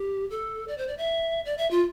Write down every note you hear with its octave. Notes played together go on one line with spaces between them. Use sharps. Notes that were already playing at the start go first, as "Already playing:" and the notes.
Already playing: G4
A4
D5
C5
D5
E5
D5
E5
F4